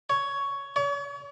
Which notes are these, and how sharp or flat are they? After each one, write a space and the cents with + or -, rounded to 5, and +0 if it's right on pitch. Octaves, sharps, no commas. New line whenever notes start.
C#5 +10
C#5 +40